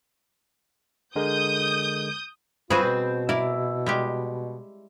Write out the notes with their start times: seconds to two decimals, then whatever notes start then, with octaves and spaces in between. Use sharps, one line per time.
1.16 D3 G#3 A#4 D#6 G6
2.70 C4 F4 F#4 G#4 B4
2.83 B2
3.29 E4 A#4 D5
3.86 G3 G#3 G4